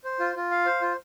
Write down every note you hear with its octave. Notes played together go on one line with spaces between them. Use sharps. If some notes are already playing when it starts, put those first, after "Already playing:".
C5
F4
F4
F5
C5
F4